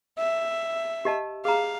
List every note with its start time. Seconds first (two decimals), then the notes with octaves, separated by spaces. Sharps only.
0.18 E5
1.05 G4 D#5 A5
1.45 G#4 F5 A#5